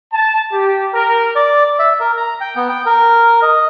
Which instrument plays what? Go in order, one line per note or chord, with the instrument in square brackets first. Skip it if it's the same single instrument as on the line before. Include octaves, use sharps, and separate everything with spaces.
[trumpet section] A5
G4
A#4
[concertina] D5
E5
A#4
A#5
G5
B3
G5
A#4
D#5